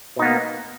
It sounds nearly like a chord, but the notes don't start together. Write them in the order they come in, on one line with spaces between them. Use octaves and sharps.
B2 D#4 B3 A#3